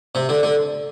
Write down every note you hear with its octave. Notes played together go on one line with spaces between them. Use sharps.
C3
D3
D3